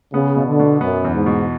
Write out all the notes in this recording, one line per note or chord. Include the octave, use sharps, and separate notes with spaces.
C#3 B3
B2
D3
B2
F#2 B3
E2
G#2
B2